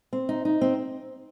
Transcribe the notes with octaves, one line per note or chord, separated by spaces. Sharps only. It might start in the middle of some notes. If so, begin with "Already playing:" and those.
C4
D#4
D#4
C4